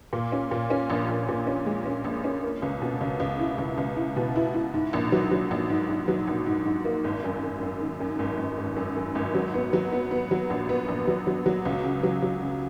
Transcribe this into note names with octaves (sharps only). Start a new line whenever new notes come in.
A#2
C#4
A#2
C#4
A#1
A#1
A#2
C#4
G#3
C#4
A#1
C#4
A#3
C#2
B2
C#2
C#2
E4
C#2
C#2
E4
B2
E4
E4
G#2
A#1
F#3
F#3
A#1
G#2
G#2
F#3
A#1
G#2
G#2
A#3
G#1
F#2
F#2
F#2
D#3
F#2
G#1
G#1
G#1
F#2
F#2
G#1
F#3
B3
F#3
B3
B3
F#3
A#1
B3
A#1
F#3
F#3
F#3
C#2
C#3
F#3
F#3
C#3